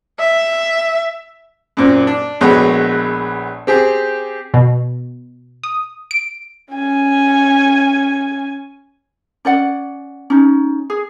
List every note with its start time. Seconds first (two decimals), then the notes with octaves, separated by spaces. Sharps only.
0.19 E5
1.77 F#2 A#2 C4
2.07 D4
2.41 A#1 G#3 A3 B3 F#4 C#5
3.67 C4 G4 G#4
4.54 B2
5.64 D#6
6.11 D7
6.74 C#4 G#5
9.45 C#4 D5 F#5
10.30 C#4 D#4
10.90 G#4